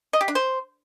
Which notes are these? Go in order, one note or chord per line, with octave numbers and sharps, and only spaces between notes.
D#5
G4
D4
C5